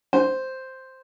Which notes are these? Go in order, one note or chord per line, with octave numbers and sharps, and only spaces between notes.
C5